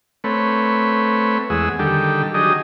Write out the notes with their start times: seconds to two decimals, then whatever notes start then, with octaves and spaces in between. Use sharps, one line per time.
0.24 A3 C4 B4 C#5
1.50 E2 G#3 G#4 F#5 E6
1.79 D3 D#3 G3 G4 A4
2.34 F#3 D4 D#4 G4 G#4 D#5